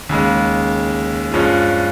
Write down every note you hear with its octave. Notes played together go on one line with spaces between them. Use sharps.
D#2 C#3 G#3
G2 F3 G#3 C#4 F4